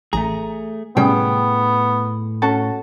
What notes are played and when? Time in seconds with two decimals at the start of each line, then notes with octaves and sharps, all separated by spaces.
0.13 A1 A3 G#4 A#5
0.97 A2 C3 G3 B3 C#4 G#4 G5
2.42 C#4 F#4 A4